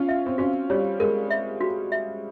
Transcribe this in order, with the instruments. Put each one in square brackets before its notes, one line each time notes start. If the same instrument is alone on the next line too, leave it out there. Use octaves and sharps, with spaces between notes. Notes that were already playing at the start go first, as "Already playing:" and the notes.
Already playing: [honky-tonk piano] C#4 F4
[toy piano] E5
[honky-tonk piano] C4
[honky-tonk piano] C#4 [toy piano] F#4
[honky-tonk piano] G3 [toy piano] C#5
[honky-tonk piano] G#3 [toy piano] A#4
[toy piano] E5
F#4
E5